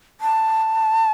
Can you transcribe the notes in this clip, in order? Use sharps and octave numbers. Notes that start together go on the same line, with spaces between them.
A5